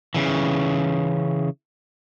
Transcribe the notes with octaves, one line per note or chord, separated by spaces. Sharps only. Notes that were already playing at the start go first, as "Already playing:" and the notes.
C#3 E3